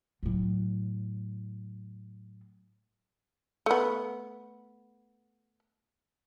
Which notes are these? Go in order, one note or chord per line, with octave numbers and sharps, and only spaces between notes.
A2 F#3
A3 B3